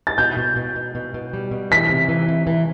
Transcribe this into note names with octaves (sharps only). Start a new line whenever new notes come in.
A6
B2 G6
B2
B2
B2
B2
B2
G3
B2
E3 B6
C3
E3
C3
E3